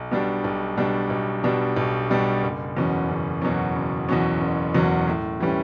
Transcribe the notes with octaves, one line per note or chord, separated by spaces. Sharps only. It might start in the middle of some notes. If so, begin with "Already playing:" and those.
Already playing: B1
B2 G3 D4
B1
B2 G3 D4
B1
B2 G3 D4
B1
B2 G3 D4
F#1
E2 B2 F#3 C#4
F#1
E2 B2 F#3 C#4
F#1
E2 B2 F#3 C#4
F#1
E2 B2 F#3 C#4
A2
E3 G3 C#4